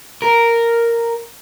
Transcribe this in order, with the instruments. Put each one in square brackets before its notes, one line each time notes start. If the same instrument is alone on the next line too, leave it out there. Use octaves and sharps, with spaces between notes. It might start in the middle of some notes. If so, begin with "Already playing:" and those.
[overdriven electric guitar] A#4